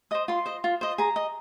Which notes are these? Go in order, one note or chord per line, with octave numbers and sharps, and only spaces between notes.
C5 D#5 D#6
F4 C6
C5 D#5
F4
C5 D#5
G#4 A#5
D#5